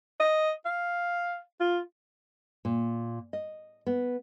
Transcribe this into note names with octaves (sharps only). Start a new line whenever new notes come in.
D#5
F5
F4
A#2
D#5
B3